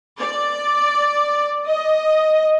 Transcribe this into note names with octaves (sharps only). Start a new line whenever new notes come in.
D5
D#5